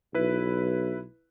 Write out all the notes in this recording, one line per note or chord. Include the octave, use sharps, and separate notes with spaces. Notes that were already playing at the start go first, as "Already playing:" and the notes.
B1 E4 B4